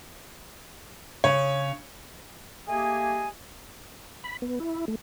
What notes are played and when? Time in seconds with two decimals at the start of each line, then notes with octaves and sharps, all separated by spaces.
1.24 C#3 C#5
2.67 A3 A#3 G4 G#4 D#5 G#5
4.24 B5
4.42 B3
4.60 E4
4.88 A3